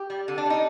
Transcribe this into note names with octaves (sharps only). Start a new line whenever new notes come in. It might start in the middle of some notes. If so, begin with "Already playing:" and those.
Already playing: G4
G3
D3
D4
G3 D#4